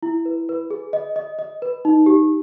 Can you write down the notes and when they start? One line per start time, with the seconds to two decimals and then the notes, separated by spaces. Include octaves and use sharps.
0.03 E4
0.25 B4
0.49 B4
0.70 G#4
0.93 D#5
1.16 D#5
1.39 D#5
1.62 B4
1.85 D#4
2.06 G4